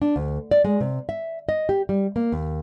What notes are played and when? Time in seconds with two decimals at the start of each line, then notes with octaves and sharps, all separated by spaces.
0.02 D4
0.16 D2
0.51 D5
0.64 G#3
0.80 C3
1.09 E5
1.49 D#5
1.69 G4
1.89 G3
2.16 A#3
2.32 D#2